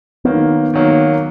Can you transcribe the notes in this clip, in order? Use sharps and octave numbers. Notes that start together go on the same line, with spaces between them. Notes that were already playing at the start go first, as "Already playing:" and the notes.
D#3 F#3 A#3 B3
D#3 F#3 A#3